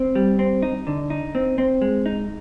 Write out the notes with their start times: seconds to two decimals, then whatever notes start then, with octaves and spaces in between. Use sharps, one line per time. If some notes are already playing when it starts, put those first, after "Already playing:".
Already playing: C4
0.15 G3
0.39 C4
0.62 D#4
0.87 D3
1.10 D#4
1.35 C4
1.58 C4
1.82 G#3
2.06 D#4